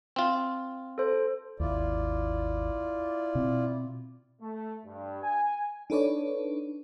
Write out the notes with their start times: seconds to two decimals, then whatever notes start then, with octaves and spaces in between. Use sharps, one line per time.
0.16 C4 F4
0.98 A4 C5
1.60 G#1 D#2 E4 F4 D5
3.35 B2 C4
4.41 A3
4.85 G2
5.23 G#5
5.90 D4 D#4 A4 B4 C#5 D5